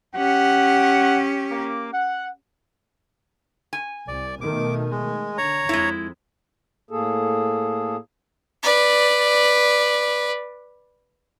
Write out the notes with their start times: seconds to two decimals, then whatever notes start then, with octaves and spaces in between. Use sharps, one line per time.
0.16 C#4 G4 F#5
1.51 A#3 D6
1.93 F#5
3.73 G#5
4.08 C2 D5
4.41 B2 D#3 A3 D6
4.91 G#3
5.38 D3 C#5 A#5
5.69 F2 G#3 E4
6.91 A2 A#3 G#4 A4
8.63 B4 D5